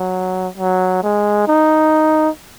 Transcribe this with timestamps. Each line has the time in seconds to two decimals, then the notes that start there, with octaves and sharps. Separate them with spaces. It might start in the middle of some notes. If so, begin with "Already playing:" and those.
Already playing: F#3
0.57 F#3
1.03 G#3
1.48 D#4